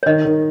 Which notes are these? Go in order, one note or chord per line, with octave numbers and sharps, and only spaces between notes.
C#5
D#3 D#5
D#3